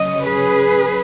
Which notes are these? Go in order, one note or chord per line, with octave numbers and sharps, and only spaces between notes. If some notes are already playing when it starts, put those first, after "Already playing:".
Already playing: C#3 F#3 C#4 D#5
G#4 B4